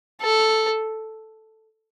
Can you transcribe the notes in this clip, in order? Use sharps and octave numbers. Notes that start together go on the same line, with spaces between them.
A4